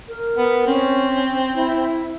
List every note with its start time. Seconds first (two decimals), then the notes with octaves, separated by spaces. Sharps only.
0.08 A#4
0.37 B3
0.67 C4 C#4
1.55 E4